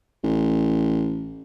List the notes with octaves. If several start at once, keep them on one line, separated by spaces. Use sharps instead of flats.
A1